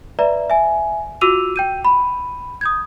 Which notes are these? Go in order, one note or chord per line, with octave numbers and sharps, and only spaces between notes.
B4 D5 E5 A#5
E5 G#5
F4 F#4 D6 E6 D#7 F7
G5 G6 D#7
B5
D#6 G6 G#6